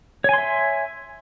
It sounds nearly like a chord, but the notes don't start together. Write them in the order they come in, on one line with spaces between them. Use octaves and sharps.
C#5 G#5 C6 E5